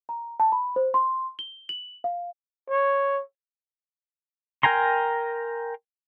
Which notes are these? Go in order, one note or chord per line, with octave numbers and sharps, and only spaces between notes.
A#5
A5
B5
C5
C6
G7
F#7
F5
C#5
A#4 G5 G#5 A#5 C6